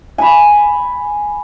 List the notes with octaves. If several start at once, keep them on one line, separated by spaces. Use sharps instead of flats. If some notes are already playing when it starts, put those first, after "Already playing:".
G#5 B5